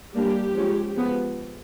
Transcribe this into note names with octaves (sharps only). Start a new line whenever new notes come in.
G3 A#3 D4 G4
F3 G#3 C#4
F3 G#3 B3